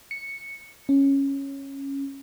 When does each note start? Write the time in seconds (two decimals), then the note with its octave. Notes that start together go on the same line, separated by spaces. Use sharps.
0.11 C#7
0.89 C#4